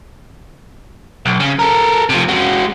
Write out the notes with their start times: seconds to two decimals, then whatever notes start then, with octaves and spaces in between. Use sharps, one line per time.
1.26 B1
1.40 C#3
1.59 A4 A#4
2.09 C3 F3
2.28 G#3 F#4